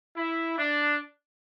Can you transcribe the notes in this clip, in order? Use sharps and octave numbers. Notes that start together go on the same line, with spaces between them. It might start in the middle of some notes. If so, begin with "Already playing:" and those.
E4
D4